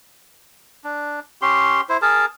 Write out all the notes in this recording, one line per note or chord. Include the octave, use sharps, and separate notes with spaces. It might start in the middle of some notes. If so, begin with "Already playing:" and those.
D4
C#4 G4 C6
E4 C5
G#4 A#4 A5